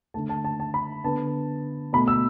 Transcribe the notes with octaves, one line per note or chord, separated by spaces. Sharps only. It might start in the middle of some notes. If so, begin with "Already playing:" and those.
D3 A3 A5
A5
A5
A5
B5
D3 B3 A5
B2 A3 B5
E6